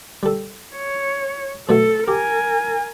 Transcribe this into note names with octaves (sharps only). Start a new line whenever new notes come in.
G3 A4
C#5
B2 F#3 A3 A4
G4 A#4 G#5